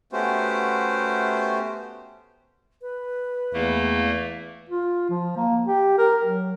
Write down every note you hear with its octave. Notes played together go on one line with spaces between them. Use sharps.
A3 B3 C#4 F#4 G4 C5
B4
E2 A3 A#3 F5
F4
F3
A#3
G4
A#4
F#3